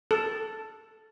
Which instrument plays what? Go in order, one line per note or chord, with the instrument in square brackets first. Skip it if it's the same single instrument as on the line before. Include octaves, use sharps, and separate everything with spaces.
[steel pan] A4